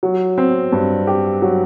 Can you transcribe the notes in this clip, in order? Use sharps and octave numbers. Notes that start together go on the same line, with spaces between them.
F#3
C4
G2
G4
F#3